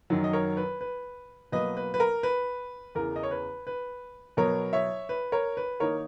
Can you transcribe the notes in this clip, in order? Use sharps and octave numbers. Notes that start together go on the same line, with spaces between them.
F#2 D#3 F#3
D#5
A#4 C#5
B4
B4
B2 F#3 A#3 B4 D#5
B4
B4
A#4
B4
E2 C#3 E3 A#4
D#5
C#5
B4
B4
B2 F#3 B3 A#4 C#5
C#5 E5
B4
A#4 C#5
B4
D#3 A#3 D#4 A#4 C#5